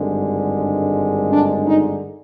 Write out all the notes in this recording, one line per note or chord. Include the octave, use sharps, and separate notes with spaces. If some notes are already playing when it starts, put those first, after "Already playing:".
Already playing: G#1 G2 D3 G#3
D4
D#4